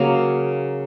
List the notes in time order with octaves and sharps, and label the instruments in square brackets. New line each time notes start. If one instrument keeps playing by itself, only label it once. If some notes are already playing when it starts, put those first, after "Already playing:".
Already playing: [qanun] C#3 F#3 A#3 F5